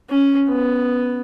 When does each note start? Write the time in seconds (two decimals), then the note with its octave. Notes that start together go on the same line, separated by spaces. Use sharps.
0.10 C#4
0.49 B3